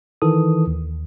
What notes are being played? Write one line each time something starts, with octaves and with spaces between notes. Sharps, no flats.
D#3 E3 A4 D#6
D#2